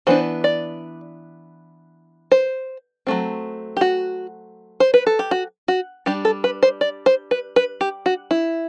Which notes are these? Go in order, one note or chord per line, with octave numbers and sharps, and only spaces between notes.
E3 B3 D4 C5
D5
C5
F#3 A3 C4
G4
F#4
C5
B4
A4
G4
F#4
F#4
G3 D4 G4
A4
B4
C5
D5
C5
B4
B4
G4
F#4
E4